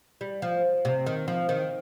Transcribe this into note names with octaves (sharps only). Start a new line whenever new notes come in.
G3
F3
C3
D#3
F3
D#3